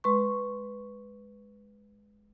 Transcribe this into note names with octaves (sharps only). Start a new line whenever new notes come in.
G#3 B4 C6 C#6